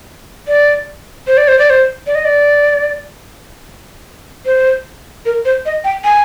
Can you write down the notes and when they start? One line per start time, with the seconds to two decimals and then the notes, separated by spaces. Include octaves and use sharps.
0.48 D5
1.27 C5
1.37 D5
1.48 C5
1.59 D5
1.70 C5
2.07 D5
2.15 D#5
2.25 D5
4.46 C5
5.25 A#4
5.45 C5
5.66 D#5
5.84 G5
6.04 G#5